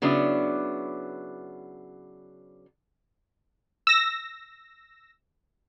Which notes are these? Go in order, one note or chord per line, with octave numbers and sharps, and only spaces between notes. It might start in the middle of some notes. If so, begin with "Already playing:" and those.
C#3 F#3 B3 D4 E4
E6 A#6